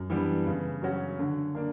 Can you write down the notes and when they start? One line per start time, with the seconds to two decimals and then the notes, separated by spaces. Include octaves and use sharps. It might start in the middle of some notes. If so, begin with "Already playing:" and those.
Already playing: F#2
0.10 E3 G3 B3 D4
0.46 C#3
0.82 F#3 C#4 F#4
1.19 D3
1.55 A#3 D4